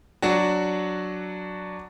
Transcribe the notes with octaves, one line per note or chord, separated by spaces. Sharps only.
F#3 D4 F#4